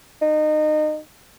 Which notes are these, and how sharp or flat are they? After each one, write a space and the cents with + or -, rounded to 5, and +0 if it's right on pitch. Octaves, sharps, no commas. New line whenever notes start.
D#4 -25